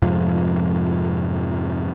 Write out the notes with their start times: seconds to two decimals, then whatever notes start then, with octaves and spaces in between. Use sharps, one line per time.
0.02 F2 G#2 C3 F3